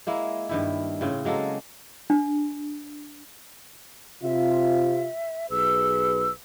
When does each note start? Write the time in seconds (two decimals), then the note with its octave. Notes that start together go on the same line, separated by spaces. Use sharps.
0.07 G#3 A#3 E4
0.49 G2 D#3 E4
1.01 A2 C#3 C4
1.25 F#3 G#3 A#3 A4
2.10 D4
4.23 C3 F4 E5
5.51 B1 G#4 B4 E6